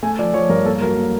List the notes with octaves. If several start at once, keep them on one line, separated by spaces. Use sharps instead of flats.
A3 G#5
F3 D5
F3 C#5
G2 A#4
A#3 A4
F#3 A#4
A#3